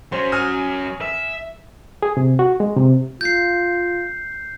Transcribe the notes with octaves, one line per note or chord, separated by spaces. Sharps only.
F#3 C#4 C5
G#5 D#6 F6
E5
G#4
C3
F#4
G#3
C3
F4 G6 C7